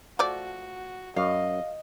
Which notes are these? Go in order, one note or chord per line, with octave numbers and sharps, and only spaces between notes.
F3 A3 F#4 D5
F#2 D#5 F5